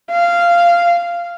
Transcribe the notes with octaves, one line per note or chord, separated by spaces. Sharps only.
F5